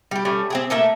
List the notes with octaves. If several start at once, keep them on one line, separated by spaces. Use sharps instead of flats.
G3 G4
G3 A3 C#4
C4 G4 G#4
A3 A#3 E5